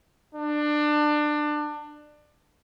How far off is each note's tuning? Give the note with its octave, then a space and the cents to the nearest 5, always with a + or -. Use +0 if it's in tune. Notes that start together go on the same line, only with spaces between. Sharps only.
D4 +25